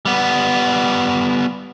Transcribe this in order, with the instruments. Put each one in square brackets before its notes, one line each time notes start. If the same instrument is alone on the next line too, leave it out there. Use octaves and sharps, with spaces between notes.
[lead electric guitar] G3 B3